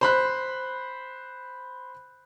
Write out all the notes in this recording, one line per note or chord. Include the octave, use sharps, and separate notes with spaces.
C5 B5 F#6